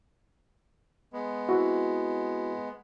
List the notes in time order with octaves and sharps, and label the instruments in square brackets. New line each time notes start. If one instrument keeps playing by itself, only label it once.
[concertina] G#3 B3
[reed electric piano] C4 E4 F#4